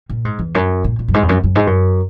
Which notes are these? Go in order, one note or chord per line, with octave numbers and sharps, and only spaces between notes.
A#2
G#2
E2
F#2
A#2
A#2
F#2
G#2
E2
F#2
F#2
G#2
F#2